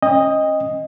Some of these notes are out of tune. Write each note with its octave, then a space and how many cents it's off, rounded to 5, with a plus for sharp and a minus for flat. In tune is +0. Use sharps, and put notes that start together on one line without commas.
C#4 -25 D#5 +0 G5 +35